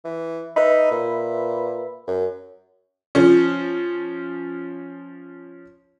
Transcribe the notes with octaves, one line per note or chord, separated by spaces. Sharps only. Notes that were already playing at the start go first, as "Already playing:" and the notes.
E3
D#4 B4 E5 B5
A#2
F#2
F3 C#4